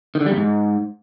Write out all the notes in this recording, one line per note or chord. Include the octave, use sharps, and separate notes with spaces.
D#3
D3
G3
E2
G#2